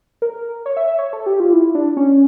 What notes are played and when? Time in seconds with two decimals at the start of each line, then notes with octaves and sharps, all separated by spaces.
0.22 A#4
0.66 C#5
0.77 E5
0.87 E5
0.99 C#5
1.13 A4
1.26 G4
1.40 F4
1.53 E4
1.75 D4
1.97 C#4